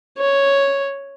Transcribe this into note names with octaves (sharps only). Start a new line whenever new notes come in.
C#5